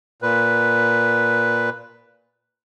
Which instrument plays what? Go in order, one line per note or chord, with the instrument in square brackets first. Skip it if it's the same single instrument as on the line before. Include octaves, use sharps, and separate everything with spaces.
[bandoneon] A#2 B4